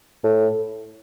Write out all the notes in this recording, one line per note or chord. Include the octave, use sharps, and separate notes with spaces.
A2